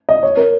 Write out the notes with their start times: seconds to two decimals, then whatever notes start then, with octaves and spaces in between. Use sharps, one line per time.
0.09 D#5
0.23 C#5
0.37 A#4